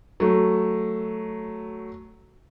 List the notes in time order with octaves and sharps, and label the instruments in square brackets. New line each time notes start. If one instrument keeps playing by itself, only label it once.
[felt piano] F#3 A3